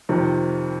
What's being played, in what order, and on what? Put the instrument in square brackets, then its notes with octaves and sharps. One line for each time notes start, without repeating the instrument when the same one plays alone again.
[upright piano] F2 C3 D#3